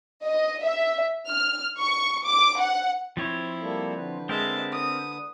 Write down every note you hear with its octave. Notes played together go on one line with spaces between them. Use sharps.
D#5
E5
F6
C#6
D6
F#5
F3 C4 E4 C#5
G3 A#3 A4
D3 B4
G#3 C4 A#4 E5 A5
D#6